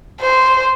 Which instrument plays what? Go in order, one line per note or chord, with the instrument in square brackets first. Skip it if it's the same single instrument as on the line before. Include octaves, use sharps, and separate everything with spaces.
[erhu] C5